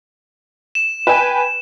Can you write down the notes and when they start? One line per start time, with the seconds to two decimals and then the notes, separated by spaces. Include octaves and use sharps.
0.75 E7
1.07 B4 G5 G#5